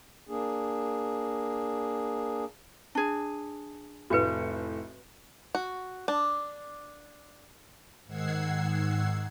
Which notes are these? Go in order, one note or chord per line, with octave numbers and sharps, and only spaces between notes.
A#3 D4 G#4
D4 G#4
F1 A2 F#4 B4 C#7
F#4
D4
G#2 D#3 F#5 E6 G#6 C7